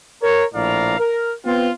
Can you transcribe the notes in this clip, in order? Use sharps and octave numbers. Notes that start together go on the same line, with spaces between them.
A#4 C#5
A#1 A2 D5 F5 A#5
A#4
B3 C4 F4